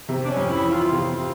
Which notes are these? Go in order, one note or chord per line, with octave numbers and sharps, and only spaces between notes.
C3
D4
C#4
F2
E4
E3
F4
C3 F4